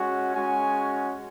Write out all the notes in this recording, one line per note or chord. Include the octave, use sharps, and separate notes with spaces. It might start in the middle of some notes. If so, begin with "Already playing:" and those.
Already playing: G#3 C#4 F#4
G#3 C#4 F#4 G#5